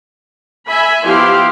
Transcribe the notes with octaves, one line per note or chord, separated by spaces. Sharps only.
E5 G#5 B5
F3 B3 E4 G4 F5 C6